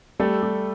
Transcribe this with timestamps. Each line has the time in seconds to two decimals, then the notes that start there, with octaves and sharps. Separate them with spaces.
0.20 G3 A3 A4
0.43 G3